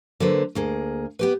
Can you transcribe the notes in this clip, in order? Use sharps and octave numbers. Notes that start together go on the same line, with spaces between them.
D3 F#3 A#3 B4 C5
D2 A#3 G#4
B3 G4 B4